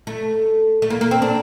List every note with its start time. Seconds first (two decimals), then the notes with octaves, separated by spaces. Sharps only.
0.07 A3
0.82 A3
0.90 A#3
1.01 A#3
1.11 C4
1.22 D4